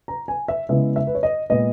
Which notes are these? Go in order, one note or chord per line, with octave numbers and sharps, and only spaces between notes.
A#5
G#5
E5
C#3 G#3 B3 E4 E5
E5
B4
C#5
D#5
A#2 G#3 B3 D#5